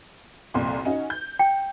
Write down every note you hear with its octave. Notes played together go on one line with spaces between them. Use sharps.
C2 F2 A#2
C#4 D#4 F#4
G6
G5